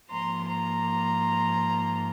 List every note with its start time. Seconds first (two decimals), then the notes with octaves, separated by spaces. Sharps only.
0.11 G#2 F3 A#3 A#5 C6
0.48 A#5 C6